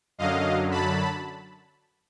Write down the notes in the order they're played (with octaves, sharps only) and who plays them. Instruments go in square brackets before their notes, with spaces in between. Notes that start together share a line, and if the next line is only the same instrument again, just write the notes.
[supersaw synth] F#2 D3 F#3 D#5 F5
A5 B5